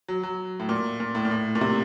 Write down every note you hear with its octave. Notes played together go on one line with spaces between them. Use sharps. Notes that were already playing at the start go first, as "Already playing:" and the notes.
F#3
F#3
A2
A#2
A#2
A2
A#2
A2
A#2
C3